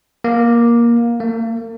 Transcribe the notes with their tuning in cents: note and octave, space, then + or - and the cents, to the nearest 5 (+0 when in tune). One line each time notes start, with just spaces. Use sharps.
A#3 +15
A#3 -40